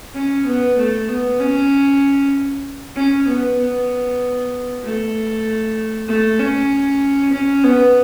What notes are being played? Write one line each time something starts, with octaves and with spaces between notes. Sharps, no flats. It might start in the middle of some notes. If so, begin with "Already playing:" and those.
C#4
B3
A3
B3
C#4
C#4
B3
B3
A3
A3
C#4
C#4
B3